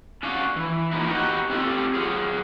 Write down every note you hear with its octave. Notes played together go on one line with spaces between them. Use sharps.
C#4 D4 F#4 F5
E3
F3 A#3 D#4 E4
D#4 F#4 G4 B4 D#5
C4 C#4 F4 G4 A4
F#3 F4 G#4